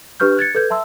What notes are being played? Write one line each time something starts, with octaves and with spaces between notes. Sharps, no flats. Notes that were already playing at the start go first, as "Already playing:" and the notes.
D4 G4 B4 C#6 F6 G6
F#6 G#6 A6 C#7
A4 B4 G6 G#6
E5 A5 C6 E6